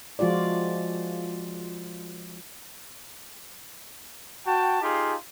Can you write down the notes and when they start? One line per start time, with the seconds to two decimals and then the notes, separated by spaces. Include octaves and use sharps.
0.19 F3 G#3 F4 F#4 D5
4.46 F#4 G5 A5
4.81 D#4 F4 G4 G#4 F5 C6